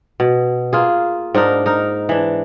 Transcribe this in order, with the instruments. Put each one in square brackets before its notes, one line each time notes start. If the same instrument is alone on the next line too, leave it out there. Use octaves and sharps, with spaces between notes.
[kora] B2
A#3 F4 G#4
G#2 D4 D#4 A#4
D#4 A#4
E3 D4